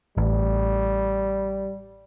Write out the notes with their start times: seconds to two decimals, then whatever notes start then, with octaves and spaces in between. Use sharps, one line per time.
0.17 A1 G3